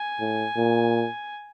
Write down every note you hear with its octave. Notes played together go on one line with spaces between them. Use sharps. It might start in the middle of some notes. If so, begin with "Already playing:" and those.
Already playing: G#5
A2
A#2